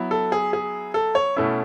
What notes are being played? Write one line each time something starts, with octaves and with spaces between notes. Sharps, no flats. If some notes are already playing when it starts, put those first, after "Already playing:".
Already playing: F#3 B3 E4
A4
G#4
G#4
A4
C#5
B2 A3 C#4 E4